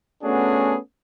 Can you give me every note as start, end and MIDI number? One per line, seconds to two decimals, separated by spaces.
0.23 0.77 57
0.23 0.77 59
0.23 0.77 61
0.23 0.77 62
0.23 0.77 66
0.23 0.77 68